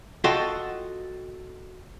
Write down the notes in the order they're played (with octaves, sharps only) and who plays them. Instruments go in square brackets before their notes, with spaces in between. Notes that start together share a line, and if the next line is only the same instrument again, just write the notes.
[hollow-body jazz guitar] F4 F#4 A4 D#5 G5 C6